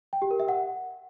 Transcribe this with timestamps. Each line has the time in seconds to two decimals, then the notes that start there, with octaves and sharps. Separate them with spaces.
0.13 G5
0.22 G4
0.31 A#4
0.40 E5
0.49 F#5